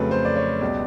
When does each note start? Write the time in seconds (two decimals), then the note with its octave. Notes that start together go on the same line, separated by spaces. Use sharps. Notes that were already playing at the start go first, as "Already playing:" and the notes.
Already playing: F2 C#3 F#3 A3 B4
0.11 C5
0.25 D5
0.36 C#5
0.61 C#2 B2 G3 D5